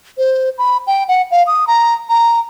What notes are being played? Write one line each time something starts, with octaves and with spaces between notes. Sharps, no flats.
C5
B5
G5
F#5
F5
D#6
A#5
A#5